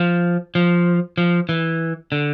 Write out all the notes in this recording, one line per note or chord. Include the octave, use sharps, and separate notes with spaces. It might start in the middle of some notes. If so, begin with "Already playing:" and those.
Already playing: F3
F3
F3
E3
D3